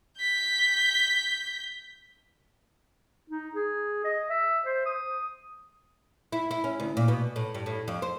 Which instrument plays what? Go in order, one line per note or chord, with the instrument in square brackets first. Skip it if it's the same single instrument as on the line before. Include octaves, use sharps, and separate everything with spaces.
[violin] G6 B6
[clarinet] D#4
G#4
D#5
E5
C5
D#6
[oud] E4
E4
C#4
D2
A#2
B2
A2
G2
A2
F2
C5